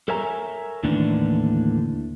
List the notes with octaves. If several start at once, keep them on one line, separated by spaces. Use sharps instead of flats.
A4 A#4 C#5 E5 G#5 A#5
D#2 A2 D3 E3 D4